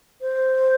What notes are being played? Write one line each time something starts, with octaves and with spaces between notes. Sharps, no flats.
C5